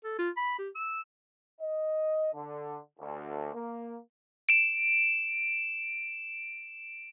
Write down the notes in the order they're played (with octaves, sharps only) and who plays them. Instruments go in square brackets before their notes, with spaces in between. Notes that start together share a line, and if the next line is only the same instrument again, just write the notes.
[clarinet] A4
F4
B5
G4
E6
[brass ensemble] D#5
D3
D2
A#3
[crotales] D7 E7